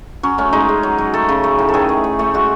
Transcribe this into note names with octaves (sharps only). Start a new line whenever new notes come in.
F#3 C#4
A3 C#4
G#3 D#4
G#3
F#3
F#3
A3 A4
C#3
A3
A2
A4
D#3 G#4
A3
A3
A3
G#3 F#4